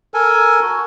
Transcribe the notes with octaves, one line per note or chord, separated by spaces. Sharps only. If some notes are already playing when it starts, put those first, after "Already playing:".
A4 A#4 G#5
F#4